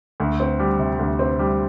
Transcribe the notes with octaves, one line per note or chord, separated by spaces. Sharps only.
D2
C4
G3
C3
D2
C4
G3